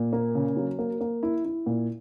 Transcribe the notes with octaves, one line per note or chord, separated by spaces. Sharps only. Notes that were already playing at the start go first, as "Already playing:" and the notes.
Already playing: A#2
A#3
C#3
F#3
A#3
A#3
E4
E4
A#2